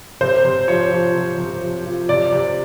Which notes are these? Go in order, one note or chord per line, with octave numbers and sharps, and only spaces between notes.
C3 C5
C3
F3 C#5
F3
C3
C3
F3
F3
C3 D5
C3